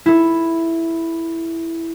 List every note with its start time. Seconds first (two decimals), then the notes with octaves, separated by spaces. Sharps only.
0.06 E4 A4